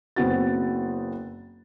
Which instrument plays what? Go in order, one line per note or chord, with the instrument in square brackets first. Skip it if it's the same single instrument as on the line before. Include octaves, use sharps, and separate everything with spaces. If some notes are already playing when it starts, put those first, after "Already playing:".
[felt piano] F#1 B3 C4 F#4 A6